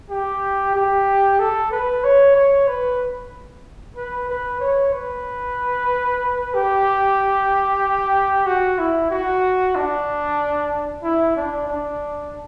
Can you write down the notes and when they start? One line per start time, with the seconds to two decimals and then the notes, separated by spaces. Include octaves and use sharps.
0.10 G4
0.75 G4
1.39 A4
1.71 B4
2.04 C#5
2.35 C#5
2.67 B4
3.97 B4
4.29 B4
4.60 C#5
4.93 B4
6.54 G4
8.46 F#4
8.78 E4
9.10 F#4
9.75 D4
11.03 E4
11.36 D4
11.67 D4